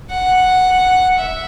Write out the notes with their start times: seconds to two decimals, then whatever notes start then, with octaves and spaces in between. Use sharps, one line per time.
0.10 F#5
1.18 E5